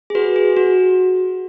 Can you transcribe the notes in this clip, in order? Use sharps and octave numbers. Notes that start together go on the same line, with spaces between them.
G#4
F#4 B4
G#4
F#4